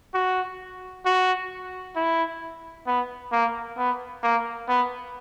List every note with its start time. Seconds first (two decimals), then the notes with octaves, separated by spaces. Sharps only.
0.14 F#4
1.06 F#4
1.96 E4
2.87 B3
3.32 A#3
3.78 B3
4.23 A#3
4.69 B3